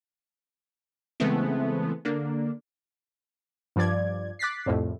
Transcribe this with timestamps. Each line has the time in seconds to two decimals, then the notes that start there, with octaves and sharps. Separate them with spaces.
1.20 C#3 E3 G#3 A3 B3 C4
2.05 D3 A#3 D4
3.76 G2 F3 D5 G#6
4.39 D6 F#6 A6 B6 C7
4.66 C2 F2 A2